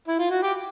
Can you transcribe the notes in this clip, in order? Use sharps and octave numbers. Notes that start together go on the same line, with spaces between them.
E4
F4
F#4
G4